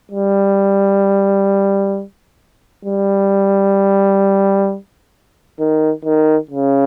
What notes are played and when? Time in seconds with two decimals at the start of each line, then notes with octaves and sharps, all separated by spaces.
0.12 G3
2.85 G3
5.59 D#3
6.04 D#3
6.51 C#3